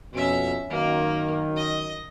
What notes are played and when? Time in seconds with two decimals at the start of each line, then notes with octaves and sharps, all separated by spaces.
0.13 F2 B2 C#4 E5
0.70 F#2 D#3 A#3
1.56 D#5